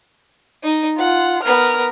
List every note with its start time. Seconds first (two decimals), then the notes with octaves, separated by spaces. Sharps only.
0.63 D#4
0.98 F4 F#5
1.44 B3 A#4 F6